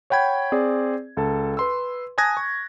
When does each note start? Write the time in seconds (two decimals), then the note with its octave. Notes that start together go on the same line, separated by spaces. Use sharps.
0.10 C#5 F#5 G5 B5 G#6
0.52 C4 G#4 D5
1.17 C#2 A4 A5
1.57 B4 C6 E6
2.18 G#5 A5 D#6 F#6 G#6 A#6
2.37 C#6